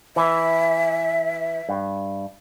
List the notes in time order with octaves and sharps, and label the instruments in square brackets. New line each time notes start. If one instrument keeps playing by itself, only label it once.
[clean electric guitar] E3 [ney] E5
[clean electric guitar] G2